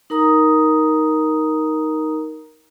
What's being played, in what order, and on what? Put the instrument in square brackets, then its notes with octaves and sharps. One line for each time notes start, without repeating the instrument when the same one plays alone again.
[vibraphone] D#4 A#4 A#5 D#6